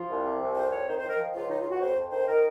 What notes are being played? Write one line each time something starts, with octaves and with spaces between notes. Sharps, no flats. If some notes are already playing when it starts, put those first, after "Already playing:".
Already playing: F3 F4
C2
C3
C2
F2 C5
F2 C#5
D#3 C5
D#3 C5
A#4
F3
C#2 F4
C#3 D#4
F4
C#2 F#4
C#5
F2 C5
F2
D#3 C5
D#3 A#4